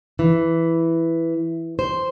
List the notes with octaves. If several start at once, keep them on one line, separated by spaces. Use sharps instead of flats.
E3
C5